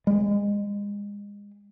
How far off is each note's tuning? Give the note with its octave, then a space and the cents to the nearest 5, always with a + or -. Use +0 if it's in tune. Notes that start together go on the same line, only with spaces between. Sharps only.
G#3 -30